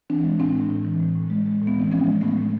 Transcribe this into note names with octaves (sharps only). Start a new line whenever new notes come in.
E3 C4 D4
G#3
A2 C4 D4
A2
A2
E3
A2
A2
G#3
G#3
A2
B3
E3 C4
F3 B3 C#4
G#3
A2 A3 B3
A2